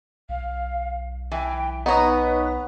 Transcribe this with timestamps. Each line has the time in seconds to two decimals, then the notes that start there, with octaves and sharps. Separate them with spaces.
0.29 B1 F5
1.31 E3 G5
1.86 B3 D#4 B4 C#5 A#5 D#6